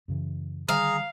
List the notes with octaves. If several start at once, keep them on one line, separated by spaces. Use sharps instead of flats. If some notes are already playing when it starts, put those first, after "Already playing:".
F#2 C#3 E3
D3 D#3 G3 G#4 F5 A#5